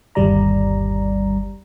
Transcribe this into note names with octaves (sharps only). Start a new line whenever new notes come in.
G1 D#2 G3 D5 A#5